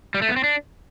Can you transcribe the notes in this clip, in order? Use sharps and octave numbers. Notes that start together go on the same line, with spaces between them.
G3
A3
B3
C4
D4